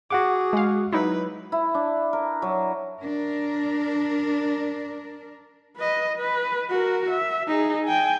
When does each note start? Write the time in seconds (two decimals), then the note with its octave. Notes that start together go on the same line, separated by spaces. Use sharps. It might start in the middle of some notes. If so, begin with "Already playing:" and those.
0.11 F#4 G#4 F#5 D6
0.53 G#3 F5
0.93 F#3 D#4 E4 B4
1.52 E4
1.74 D4
2.13 A#4
2.42 F#3
3.00 D4 A#4
5.76 B4 D#5
6.16 B4
6.70 F#4 A#4
7.11 E5
7.48 D#4 G#4
7.86 G5 G#5